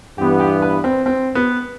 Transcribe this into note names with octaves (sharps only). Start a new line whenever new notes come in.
G2 E3 B3 G4
G4
B4
C4
C4
B3